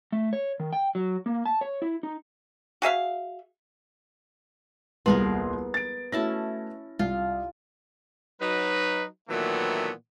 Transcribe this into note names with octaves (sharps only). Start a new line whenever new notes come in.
A3
C#5
D#3
G5
F#3
A#3
A5
C#5
E4
D#4
F#4 G#4 E5 F5
D#1 C2 B3 G#4 A#4 C6
A6 D7
A3 C#4 E4 F#4 A5 A#6
C2 F4
F#3 D#4 B4
A#2 D#3 E3 F#3 A3 B3